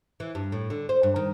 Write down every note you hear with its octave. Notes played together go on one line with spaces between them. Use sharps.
E3
G2
A2
D3
C5
G2
D#3